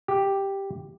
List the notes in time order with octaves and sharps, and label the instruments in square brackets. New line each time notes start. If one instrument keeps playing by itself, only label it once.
[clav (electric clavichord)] G4